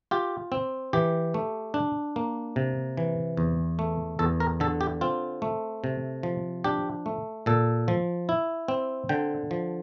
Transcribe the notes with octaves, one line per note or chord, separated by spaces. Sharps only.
F4 G4
C4
E3 G4
A3
D4
A#3
C3
E3
E2
A3
E2 A4
A#4
D3 A4
G4
C4 F4
A3
C3
F3
D4 G4
A3
A#2 A4
F3
E4
C4
D3 G5
F3